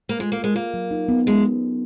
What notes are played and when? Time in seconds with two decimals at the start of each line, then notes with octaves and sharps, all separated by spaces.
0.09 A#3
0.20 G#3 F4
0.32 A#3
0.37 A#4
0.44 G#3
0.55 A#3 F4
0.74 F#3
0.91 D#4
1.09 B3
1.27 G#3 C#4